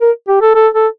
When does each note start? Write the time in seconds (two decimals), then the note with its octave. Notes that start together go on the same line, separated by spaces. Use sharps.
0.01 A#4
0.28 G4
0.41 A4
0.55 A4
0.74 A4